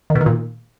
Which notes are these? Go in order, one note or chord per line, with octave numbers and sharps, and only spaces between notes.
D#3
B2
D#3
A#2